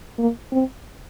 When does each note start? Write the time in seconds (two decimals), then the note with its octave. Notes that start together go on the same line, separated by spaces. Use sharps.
0.19 A#3
0.52 C4